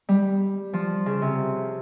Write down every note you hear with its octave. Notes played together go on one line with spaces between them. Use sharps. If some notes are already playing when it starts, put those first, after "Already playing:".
G3
F3
C#3
C3